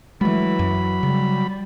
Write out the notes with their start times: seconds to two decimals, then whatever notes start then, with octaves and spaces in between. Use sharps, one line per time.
0.21 E3 F#3 G#3 A3 B5
0.59 F#2
1.03 C#3 G3